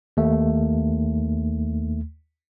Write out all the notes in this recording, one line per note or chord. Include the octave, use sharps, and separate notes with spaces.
D#2 A3